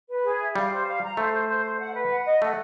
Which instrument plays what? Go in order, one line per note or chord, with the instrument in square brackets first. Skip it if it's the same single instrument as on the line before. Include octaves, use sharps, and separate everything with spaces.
[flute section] B4
G#4
E5
[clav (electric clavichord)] G3 [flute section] F5
[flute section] C5
F5
A#5
[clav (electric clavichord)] A3 [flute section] C5
[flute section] C5
C5
C5
F#5
B4
F#5
D#5
[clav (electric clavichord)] A3 [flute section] F#5